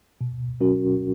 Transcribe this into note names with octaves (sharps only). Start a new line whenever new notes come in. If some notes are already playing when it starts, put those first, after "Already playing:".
B2
F#3 C#4 F#4 A#4